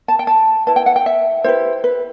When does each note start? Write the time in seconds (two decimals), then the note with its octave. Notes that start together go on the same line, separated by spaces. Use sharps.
0.08 A5
0.19 G5
0.27 A5
0.67 E4 B4 A5
0.76 G5
0.86 F#5
0.96 G5
1.06 E5
1.44 E4 G4 B4 C5
1.84 B4